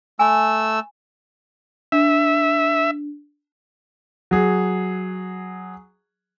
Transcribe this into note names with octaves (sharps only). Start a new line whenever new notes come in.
A3 G#5 B5 E6
D4 E5
F#3 G#4